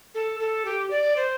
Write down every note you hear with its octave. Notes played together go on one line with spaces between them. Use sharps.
A4
A4
G4
D5
C5